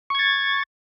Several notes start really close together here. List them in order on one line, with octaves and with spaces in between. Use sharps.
C#6 G#6 A6